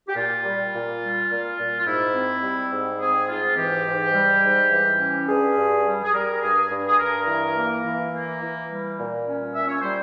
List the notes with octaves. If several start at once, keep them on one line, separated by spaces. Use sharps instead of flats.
G4
A#2 F4
G3
A#2
G3
A#2
A#2
F4
G#2 E4
C4
G3
G#2
C4 G#4
G#2 F4
E3 G4
G#2
G3
G#2
E3
C#4
G2 G#4
G2
G3
G#4
G3 A#4
G2 G#4
G2
G#4
G2 A#4
E3
A#3
E3
A#3
E3
G3
A#2
C#4
A#2 E5
C#5
G3 C5